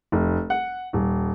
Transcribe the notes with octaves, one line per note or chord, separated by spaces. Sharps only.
F1
F#5
D#1